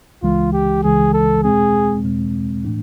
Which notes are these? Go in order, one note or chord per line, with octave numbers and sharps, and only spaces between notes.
C#2 C#3 E3 G#3 F4
G4
C#2 C#3 E3 G#3 G#4
A4
E2 B2 G#3 C4 G#4
E2 B2 G#3 C4
A2 E3 A3 D4